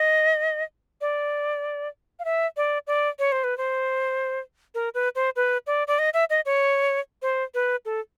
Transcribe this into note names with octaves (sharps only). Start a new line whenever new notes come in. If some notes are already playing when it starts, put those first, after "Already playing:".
Already playing: D#5
D5
F5
E5
D5
D5
C#5
C5
B4
C5
A#4
B4
C5
B4
D5
D5
D#5
E5
D#5
C#5
C5
B4
A4